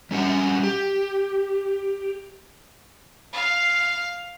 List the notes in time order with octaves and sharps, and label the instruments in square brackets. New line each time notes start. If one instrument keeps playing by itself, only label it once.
[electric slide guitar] G3 C#4 F#4 F#5
G4
[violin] F5